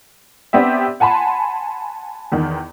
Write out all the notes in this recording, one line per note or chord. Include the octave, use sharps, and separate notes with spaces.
B3 C4 D4 G4 E5
F#5 G#5 A5 B5 C6
E2 D#3